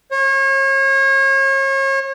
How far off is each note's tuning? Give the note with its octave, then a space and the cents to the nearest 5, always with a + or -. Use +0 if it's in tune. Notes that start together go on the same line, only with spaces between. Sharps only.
C#5 -35